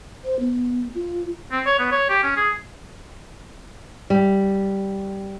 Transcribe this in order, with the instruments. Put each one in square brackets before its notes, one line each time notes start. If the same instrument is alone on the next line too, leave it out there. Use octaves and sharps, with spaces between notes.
[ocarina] C5
B3
F4
[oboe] C4
C#5
B3
C#5
G4
C#4
G#4
[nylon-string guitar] G3